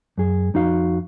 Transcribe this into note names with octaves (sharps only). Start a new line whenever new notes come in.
F#2 G#4
F2 D#4 F#4 F5